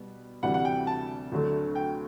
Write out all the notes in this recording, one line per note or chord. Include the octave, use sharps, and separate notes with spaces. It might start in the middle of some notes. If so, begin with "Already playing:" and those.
Already playing: B2 G3 B3
D2 C3 E3 G3 F#5
F#5
G5
A5
D2 D3 F#3 A3
G5